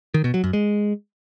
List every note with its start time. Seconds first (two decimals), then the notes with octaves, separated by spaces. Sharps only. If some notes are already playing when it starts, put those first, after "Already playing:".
0.14 D#3
0.24 B2
0.34 F#3
0.44 F#2
0.53 G#3